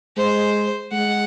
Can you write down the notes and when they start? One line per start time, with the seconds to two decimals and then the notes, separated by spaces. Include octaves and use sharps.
0.17 G#3 C5
0.92 G#3 F#5